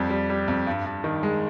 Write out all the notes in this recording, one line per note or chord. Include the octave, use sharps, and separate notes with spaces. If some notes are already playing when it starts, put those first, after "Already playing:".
Already playing: F2 G3
G3
G3
F2
G2
G2
D#3
G#3